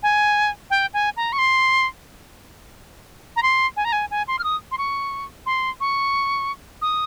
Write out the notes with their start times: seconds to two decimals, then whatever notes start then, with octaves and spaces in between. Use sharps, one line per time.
0.03 G#5
0.70 G5
0.94 G#5
1.17 A#5
1.33 C#6
1.38 C6
3.36 A#5
3.43 C6
3.76 G#5
3.85 A#5
3.92 G#5
4.11 G#5
4.28 C6
4.39 F6
4.44 D#6
4.71 C6
4.78 C#6
5.46 C6
5.80 C#6
6.82 D#6